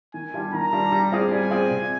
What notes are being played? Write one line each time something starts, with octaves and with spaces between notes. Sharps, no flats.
D#3 G#5
G3 D4 F4
D#3 A#5
G3 D4 F4
G3
C4 F4 G#4 D5
G3 G#5
C4 F4 G#4 D5
C3